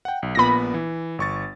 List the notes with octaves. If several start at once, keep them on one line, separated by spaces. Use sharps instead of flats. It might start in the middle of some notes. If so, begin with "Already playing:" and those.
F#5 G5
B1
A#1 A#2 B3 B5 A#6
E3
G1 C#6 A6